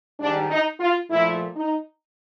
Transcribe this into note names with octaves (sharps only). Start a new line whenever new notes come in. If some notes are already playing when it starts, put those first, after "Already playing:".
G#2 D#3 G3 D4
D#4
F4
A#2 F3 A3 E4
D#4